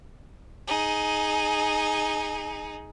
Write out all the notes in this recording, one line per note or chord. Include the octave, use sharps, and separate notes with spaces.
D#4 G#4